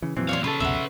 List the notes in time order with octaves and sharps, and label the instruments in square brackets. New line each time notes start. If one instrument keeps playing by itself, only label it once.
[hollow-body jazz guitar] C#3 [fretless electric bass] E3
[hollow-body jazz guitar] F2 E3 C4 [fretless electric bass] A#2 F#3
[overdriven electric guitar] E2 F5 [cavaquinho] C#5 D5 C6
[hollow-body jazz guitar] C#3 A4 [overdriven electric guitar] B4 C#5 [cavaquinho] C6
[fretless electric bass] C2 F2 B2 [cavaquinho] E5 F#5